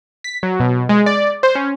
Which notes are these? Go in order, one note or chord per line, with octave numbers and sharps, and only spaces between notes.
B6
F#3
B2
G#3
D5
C5
C#4